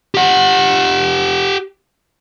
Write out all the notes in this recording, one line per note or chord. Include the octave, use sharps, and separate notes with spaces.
G4 F#5